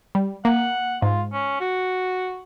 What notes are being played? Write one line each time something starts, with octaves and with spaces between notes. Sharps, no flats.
G3
A#3 F#5
G#2 F4
C#4
F#4